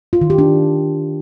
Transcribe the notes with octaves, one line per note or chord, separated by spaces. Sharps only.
F4
D#3
G4
D4